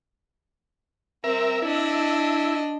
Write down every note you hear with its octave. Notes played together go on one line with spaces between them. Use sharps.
C4 A#4 E5
D4 E4 D#5